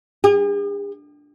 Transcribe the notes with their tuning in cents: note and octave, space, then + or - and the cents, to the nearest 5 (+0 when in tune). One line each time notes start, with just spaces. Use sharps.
G#4 -45